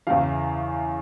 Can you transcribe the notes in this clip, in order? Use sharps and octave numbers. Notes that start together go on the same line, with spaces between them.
E2 C#3 E3 F5